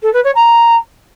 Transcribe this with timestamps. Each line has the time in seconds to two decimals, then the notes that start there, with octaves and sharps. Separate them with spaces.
0.02 A4
0.13 B4
0.24 C#5
0.35 A#5